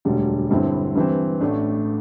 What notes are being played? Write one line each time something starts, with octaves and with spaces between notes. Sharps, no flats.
E1 D2 D3 G3
G1 G2 D3 C4 E4
G2 E3 C4
A1 A2 A3 D4